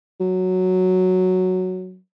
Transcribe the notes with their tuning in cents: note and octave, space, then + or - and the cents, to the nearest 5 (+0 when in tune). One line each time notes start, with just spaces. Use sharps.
F#3 +0